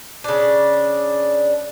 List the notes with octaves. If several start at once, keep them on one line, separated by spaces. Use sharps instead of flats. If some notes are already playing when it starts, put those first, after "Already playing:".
C#3 D4